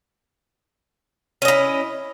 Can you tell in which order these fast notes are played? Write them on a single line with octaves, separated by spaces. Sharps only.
C#4 D#5 E4